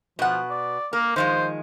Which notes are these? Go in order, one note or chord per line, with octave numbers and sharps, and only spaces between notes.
B2 F3 F#5
D5
A#3 A#4
D#3 F3 G#3 C5